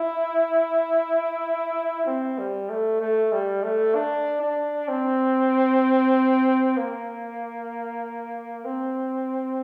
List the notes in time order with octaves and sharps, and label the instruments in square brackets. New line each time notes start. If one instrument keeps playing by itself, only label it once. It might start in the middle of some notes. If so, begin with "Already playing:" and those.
Already playing: [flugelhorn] E4
C4
G3
A3
A3
G3
A3
D4
D4
C4
A#3
C4